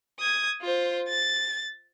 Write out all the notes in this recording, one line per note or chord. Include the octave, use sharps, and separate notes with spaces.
D#6 G#6
F4 C5
A6